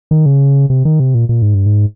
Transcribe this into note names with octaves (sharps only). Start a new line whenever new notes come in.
D#3
C#3
C3
D#3
C3
A#2
A#2
G#2
G2
G#2